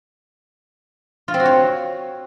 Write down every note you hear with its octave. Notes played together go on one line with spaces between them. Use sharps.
F4
C4
F#4
C#5